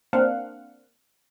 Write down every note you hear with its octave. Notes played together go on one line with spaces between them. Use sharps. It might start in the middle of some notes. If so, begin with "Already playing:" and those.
A#3 C4 D4 F5 F#5